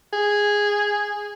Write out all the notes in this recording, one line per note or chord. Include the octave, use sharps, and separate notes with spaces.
G#4